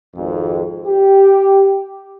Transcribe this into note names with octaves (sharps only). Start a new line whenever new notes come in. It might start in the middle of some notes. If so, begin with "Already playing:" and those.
G#1 F2
G4